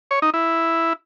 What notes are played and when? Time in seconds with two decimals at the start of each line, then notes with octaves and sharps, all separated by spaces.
0.11 C#5
0.22 D#4
0.34 E4